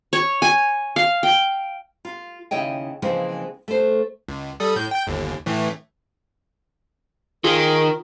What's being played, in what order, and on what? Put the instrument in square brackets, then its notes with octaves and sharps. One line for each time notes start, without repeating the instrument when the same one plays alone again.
[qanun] C#5
G#5
F5
G5
[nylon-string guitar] F4
D#2 C#3 E4 C#5 D#5 G5
C#3 E3 F3 G#3 A#3 C4
A3 C5
[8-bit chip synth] C#2
G3 A4 D#6
A2 G6
G5 G6
G1 D#2
A2 E3 A3
[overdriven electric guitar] D#3 [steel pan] F4 [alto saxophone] G#4 [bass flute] A#4